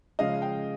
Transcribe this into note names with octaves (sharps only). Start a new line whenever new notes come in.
C#3 F3 G#3 D#5 F5
F5 G5